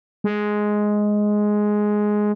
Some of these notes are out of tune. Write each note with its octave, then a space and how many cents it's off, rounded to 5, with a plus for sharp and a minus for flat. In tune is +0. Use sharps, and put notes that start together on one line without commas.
G#3 +5